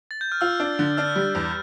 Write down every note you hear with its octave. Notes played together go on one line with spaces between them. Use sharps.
A6
G6
F6
F4 E6
D4
D3
D4 F6
G3
E2